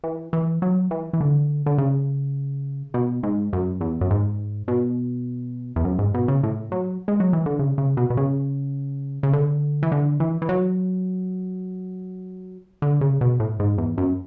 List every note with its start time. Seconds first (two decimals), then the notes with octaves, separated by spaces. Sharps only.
0.04 E3
0.33 E3
0.62 F#3
0.91 E3
1.13 E3
1.21 D3
1.66 D3
1.78 C#3
2.94 B2
3.23 G#2
3.53 F#2
3.81 E2
4.01 F#2
4.11 G#2
4.68 B2
5.76 E2
5.85 F#2
5.99 G#2
6.14 B2
6.28 C#3
6.43 A2
6.72 F#3
7.08 G#3
7.20 F#3
7.33 E3
7.46 D3
7.59 C#3
7.78 C#3
7.97 B2
8.10 B2
8.17 C#3
9.23 C#3
9.33 D3
9.83 E3
9.92 D3
10.20 E3
10.42 E3
10.49 F#3
12.82 D3
13.01 C#3
13.21 B2
13.40 A2
13.60 G#2
13.78 E2
13.98 F#2